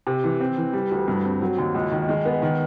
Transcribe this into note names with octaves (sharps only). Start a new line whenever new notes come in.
C3
E3
C4
E3
G3
D2
G2
C4
F#3
D#2
C#2
D#3
G#3
B3
D#3